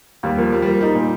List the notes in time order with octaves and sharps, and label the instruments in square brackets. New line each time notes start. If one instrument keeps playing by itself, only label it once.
[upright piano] D#2 [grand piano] G3
[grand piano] F3 [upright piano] A#3
[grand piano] G3 [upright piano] A#3
[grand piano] G3
[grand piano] F3 [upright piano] A#3
[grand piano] G3 [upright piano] D#4
[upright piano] A#2